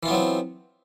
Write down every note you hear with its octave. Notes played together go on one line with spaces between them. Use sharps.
E3 F#3 B3 C4 F4